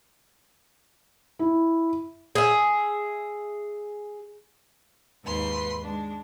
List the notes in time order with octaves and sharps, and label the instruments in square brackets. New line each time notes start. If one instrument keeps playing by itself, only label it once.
[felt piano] E4
[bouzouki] G#4 E5
[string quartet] D#2 G#2 B4 C6
G#3 D4